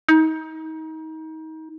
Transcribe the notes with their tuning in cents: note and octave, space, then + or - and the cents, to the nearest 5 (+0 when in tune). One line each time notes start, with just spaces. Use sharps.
D#4 +30